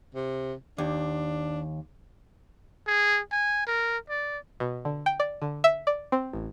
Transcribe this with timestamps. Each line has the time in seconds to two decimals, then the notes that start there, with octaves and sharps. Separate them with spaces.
0.15 C3
0.78 D#2 D4
2.87 G#4
3.32 G#5
3.67 A#4
4.09 D5
4.60 B2
4.85 D3
5.06 G5
5.20 D5
5.42 D3
5.64 E5
5.87 D5
6.12 C4
6.33 A1